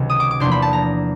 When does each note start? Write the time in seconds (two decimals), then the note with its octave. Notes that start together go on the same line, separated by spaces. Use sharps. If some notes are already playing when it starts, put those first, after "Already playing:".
Already playing: C#2 C3 D#3 F#3
0.10 D#6
0.20 D6
0.31 D6
0.40 E2 C3 F3 A#3 D4 C6
0.51 B5
0.62 A5
0.73 A#5